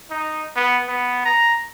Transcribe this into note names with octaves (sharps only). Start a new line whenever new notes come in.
D#4
B3
B3
A#5